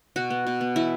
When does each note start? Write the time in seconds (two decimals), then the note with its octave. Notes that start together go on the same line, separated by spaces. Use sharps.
0.16 B2 F#4
0.30 B3
0.47 B2
0.61 B3
0.76 E3 E4